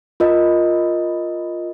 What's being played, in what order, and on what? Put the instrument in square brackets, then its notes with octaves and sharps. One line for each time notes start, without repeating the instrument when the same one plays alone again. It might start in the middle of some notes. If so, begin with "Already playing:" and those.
[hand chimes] F4 A#4 D#5